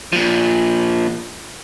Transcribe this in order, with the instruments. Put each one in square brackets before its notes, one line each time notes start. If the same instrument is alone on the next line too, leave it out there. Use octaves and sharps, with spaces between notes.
[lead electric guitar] A#2 F3